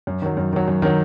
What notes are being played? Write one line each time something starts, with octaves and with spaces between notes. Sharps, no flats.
F#2
D#3 F#3
F#2
D#3 F#3
F#2
D#3 F#3